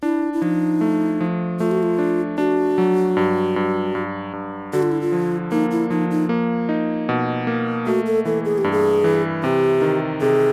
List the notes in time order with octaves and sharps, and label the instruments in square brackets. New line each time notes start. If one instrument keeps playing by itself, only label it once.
[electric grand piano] D4 [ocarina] E4
[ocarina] E4
[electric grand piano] F3 [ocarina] D#4
[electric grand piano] A3
F3
[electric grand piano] A3 [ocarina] F4
[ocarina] F#4
F4
[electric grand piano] D4
[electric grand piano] D4 [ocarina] F#4
[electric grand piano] F#3
G2
G2
G2
G2
[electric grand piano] D3 [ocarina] F#4
[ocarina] F4
E4
F4
[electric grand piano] F3
[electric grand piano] A#3 [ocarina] D#4
[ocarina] E4
[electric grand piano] F3 [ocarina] D#4
[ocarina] D#4
[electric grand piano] A#3
D#4
B2
A#3
[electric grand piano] A3 [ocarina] F#4
[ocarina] A4
[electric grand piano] E3 [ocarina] A4
[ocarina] G#4
G4
[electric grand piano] G2
[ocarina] G#4
[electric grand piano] E3
[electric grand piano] C3 [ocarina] G4
[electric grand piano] D#3
[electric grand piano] C3 [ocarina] G#4